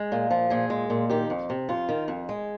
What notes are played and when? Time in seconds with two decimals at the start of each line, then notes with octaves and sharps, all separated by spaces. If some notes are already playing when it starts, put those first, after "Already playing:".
Already playing: G#3
0.12 A#2
0.31 F3
0.50 A#2 G#4
0.70 G#3
0.90 A#2
1.09 D#3 G4
1.30 F2
1.50 C3
1.69 F2 F4
1.89 D#3
2.08 F2
2.29 G#3